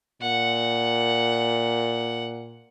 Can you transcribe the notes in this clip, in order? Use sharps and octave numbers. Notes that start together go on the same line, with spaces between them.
A#2 F#5